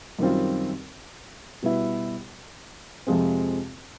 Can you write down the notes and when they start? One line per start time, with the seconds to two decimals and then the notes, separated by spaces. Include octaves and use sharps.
0.19 F#2 D#3 G3 C4 F4
1.63 B2 G3 B3 E4
3.07 F2 C3 F3 G#3 C4